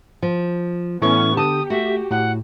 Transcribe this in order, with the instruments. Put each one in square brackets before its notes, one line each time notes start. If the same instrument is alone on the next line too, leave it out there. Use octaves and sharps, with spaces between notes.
[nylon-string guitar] F3
[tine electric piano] A2 E3 A3 [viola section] B3 C#4 [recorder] C#6
[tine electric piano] D3 [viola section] G4 [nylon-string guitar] A5 [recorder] D#6
[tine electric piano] A3 [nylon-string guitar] F#4 [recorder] E5
[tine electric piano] A2 [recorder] F#5